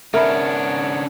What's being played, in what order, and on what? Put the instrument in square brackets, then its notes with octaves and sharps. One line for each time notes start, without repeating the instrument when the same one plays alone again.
[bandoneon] G#2 B3 C#5 [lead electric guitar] C#3 D4 [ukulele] A#4 [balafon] E5 B5